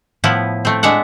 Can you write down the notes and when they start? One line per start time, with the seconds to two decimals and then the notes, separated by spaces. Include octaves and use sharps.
0.24 A2 F3 B3 E4
0.65 A3 C4
0.83 G#3 D4 E5 F#5